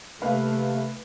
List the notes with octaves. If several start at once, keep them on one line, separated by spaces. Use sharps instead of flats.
C3 A3 A#3 B4 F5